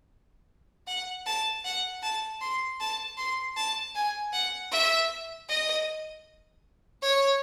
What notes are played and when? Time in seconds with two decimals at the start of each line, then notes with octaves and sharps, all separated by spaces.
0.87 F#5
1.26 A5
1.65 F#5
2.03 A5
2.41 C6
2.80 A5
3.18 C6
3.57 A5
3.95 G#5
4.33 F#5
4.72 E5
5.49 D#5
7.02 C#5